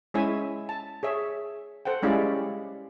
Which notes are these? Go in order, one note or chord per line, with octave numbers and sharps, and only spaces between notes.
G#3 C#4 E4 C#5 E5 G#5
A5
G#4 C#5 E5
A4 C5 F#5 G5
G3 G#3 C#4 E4 D5 F5